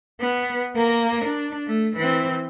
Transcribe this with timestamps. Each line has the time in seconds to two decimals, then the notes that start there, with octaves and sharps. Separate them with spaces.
0.21 B3
0.76 A#3 A#4
1.26 D4
1.67 A3
1.97 E3 C4